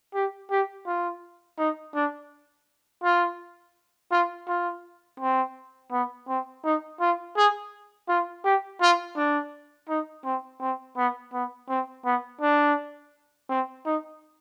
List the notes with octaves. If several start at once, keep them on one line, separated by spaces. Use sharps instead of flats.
G4
G4
F4
D#4
D4
F4
F4
F4
C4
B3
C4
D#4
F4
G#4
F4
G4
F4
D4
D#4
C4
C4
B3
B3
C4
B3
D4
C4
D#4